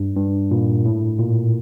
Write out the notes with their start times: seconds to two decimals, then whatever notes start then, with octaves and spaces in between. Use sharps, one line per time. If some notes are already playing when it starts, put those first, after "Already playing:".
Already playing: G2
0.16 G2
0.51 A#2
0.85 A2
1.19 A#2